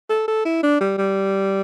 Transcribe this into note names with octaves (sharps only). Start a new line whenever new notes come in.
A4
A4
E4
D4
G3
G3